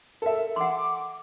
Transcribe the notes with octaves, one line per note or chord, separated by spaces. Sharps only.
A4 A#4 E5
F#5 C6 D6